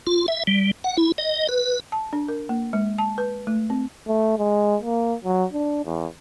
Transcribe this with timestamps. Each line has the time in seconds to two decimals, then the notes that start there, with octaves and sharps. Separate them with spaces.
0.07 F4
0.28 E5
0.47 G3
0.84 F#5
0.97 E4
1.18 D#5
1.49 B4
1.92 A5
2.13 D4
2.28 A#4
2.49 A#3
2.73 G#3
2.98 A5
3.18 B4
3.47 A3
3.70 C4
4.08 A3
4.38 G#3
4.82 A#3
5.24 F#3
5.53 D4
5.85 E2